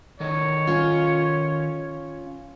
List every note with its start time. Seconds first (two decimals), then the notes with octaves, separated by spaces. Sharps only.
0.20 D#3 A4 C#5 D#5
0.67 C#4 F4